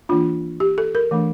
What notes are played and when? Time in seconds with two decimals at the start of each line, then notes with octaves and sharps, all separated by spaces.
0.09 E3 A#3 D4 F4
0.60 G4
0.78 A4
0.95 A#4
1.11 E3 A3 D4